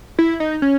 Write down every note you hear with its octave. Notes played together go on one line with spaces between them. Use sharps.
E4
D#4
C#4